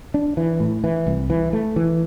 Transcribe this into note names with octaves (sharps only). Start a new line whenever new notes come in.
D4
E3
A2
E3
C2
E3
A3
E3